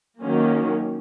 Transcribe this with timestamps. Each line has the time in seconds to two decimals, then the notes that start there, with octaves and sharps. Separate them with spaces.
0.22 D#3 F#3 A#3 C#4